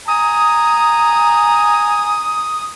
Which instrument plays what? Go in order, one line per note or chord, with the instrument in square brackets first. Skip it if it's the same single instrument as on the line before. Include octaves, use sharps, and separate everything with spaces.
[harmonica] G#5 A#5 [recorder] D#6